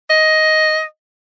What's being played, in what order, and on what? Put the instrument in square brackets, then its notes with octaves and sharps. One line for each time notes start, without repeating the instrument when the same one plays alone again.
[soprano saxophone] D#5